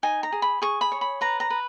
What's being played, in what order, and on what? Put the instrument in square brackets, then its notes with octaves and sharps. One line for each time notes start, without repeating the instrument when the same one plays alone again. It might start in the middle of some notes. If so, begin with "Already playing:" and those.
[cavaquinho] D#4 G#5
A#5
G#4
B5
G#4 C#6
B5
C#5
B5
B4 A#5
A#5
B4